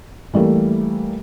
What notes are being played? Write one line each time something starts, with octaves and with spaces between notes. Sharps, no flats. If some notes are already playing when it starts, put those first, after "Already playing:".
E3 G3 A3 A#3